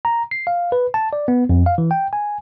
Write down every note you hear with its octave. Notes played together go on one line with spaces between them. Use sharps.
A#5
C7
F5
B4
A5
D5
B3
F2
F5
E3
G5
G#5